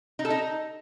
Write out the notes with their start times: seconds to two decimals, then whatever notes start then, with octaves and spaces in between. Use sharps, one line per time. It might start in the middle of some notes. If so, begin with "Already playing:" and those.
0.19 D#4
0.25 A4
0.30 D#4